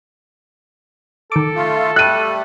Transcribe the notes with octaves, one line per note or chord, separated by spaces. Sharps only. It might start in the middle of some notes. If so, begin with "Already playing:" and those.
D#3 A4 D6
A3 F4
G3 A3 F#6 D#7